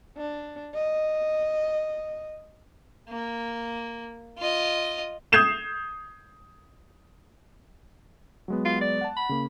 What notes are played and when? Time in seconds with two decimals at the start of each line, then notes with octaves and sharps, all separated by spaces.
0.17 D4
0.74 D#5
3.09 A#3
4.38 F4 D#5
5.32 D#6 G6 G#6 C7 E7 F7
8.48 F#3 G#3 B3
8.65 F4
8.81 D5
9.01 F#5 A5
9.16 B5
9.29 C#3 A#3